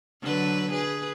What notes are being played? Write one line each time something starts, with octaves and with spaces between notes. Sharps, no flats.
D3 F#3 B4
G#4 B4